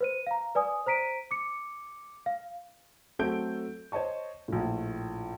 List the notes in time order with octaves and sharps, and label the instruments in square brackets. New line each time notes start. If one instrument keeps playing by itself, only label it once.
[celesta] B4 C5 D#7
F5 A#5
B4 D5 G#5 D#6
C5 A#5 B6 D7 D#7
D6 C#7
F5
[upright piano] F#3 A3 C4 A4 G6 D7
C5 C#5 D#5 A5 C#6
A#1 A2